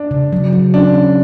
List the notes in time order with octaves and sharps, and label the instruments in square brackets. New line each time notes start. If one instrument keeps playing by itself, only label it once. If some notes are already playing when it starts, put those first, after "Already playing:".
Already playing: [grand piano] D4
[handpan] C#3
F#3
F#3
[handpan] C#4 [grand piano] D4
[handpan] C#4